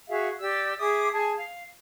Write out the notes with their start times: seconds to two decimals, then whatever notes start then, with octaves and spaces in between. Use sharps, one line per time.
0.08 F#4 G#4 E5 F5
0.39 G4 D5 E6
0.78 G#4 E5 D6 D#6
1.12 G#4 G#5 A5
1.35 F5